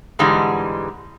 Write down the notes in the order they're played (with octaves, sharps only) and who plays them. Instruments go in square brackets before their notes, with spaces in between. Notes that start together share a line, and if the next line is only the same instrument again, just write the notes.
[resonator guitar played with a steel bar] G#2 D3 E3 G3 G#3